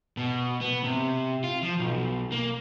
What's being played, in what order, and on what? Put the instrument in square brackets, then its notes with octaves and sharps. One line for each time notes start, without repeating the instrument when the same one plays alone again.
[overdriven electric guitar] B2
B3
C3
F4
F3
B1
A#3